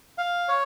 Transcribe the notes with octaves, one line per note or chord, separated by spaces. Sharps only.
F5
C#5